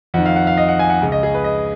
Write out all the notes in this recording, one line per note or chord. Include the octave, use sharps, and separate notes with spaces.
F2 D#3 F#5
F5
F#5
F5
D#5
F#5
G#5
F#5
C#2 C#3
D#5
G#4
B4
D#5